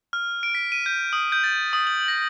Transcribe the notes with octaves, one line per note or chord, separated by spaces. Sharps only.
F6
D7
B6
D#7
G6
D#6
G6
A6
D#6
F#7
A#6